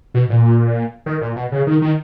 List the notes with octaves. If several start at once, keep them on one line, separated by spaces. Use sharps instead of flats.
B2
A#2
D#3
A#2
B2
C#3
D#3
D#3